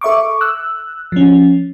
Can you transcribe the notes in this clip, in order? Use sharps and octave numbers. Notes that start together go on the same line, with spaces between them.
A4 E5 C#6 D6
E6 F#6
F3 C#4